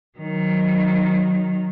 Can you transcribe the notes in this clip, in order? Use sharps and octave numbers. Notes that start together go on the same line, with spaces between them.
D#3 F#3